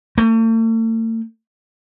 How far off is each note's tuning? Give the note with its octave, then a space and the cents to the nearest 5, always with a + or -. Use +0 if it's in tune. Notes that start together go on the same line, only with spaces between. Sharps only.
A3 +45